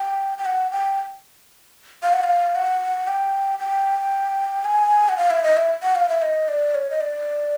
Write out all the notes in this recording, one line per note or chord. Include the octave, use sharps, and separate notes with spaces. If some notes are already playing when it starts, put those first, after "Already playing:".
Already playing: G5
G5
F#5
G5
F5
F#5
F5
F#5
G5
G5
G#5
F#5
F5
E5
D#5
E5
F#5
F5
E5
D#5
D5
C#5
D#5
D5